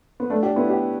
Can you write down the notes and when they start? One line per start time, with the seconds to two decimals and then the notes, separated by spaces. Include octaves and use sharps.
0.20 B3
0.30 A3 D4
0.43 D4 G4
0.56 B3 E4
0.69 D4 G4